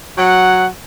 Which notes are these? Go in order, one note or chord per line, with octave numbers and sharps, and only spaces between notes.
F#3 F#5